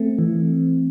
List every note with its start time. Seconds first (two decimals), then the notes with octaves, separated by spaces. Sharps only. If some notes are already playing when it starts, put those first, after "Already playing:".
Already playing: A3 C4
0.19 E3